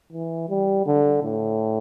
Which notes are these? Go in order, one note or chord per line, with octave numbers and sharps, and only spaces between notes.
E3
G3
D3
A2